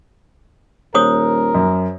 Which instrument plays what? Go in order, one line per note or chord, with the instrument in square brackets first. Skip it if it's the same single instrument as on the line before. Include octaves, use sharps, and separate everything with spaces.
[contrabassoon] D#1 [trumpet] A#4 [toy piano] C5 C#5 D#6
[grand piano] F#2